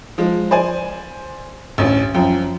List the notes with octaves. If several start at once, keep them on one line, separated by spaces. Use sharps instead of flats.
F3 G#3
C5 D5 G#5
A1 D2 C#4
F#2 F3 G5